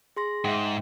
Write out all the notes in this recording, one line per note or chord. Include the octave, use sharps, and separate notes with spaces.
G#4 C6 A#6
G#2 E5 G5